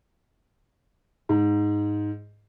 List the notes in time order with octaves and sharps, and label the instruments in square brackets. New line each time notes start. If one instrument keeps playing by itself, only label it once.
[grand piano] G#2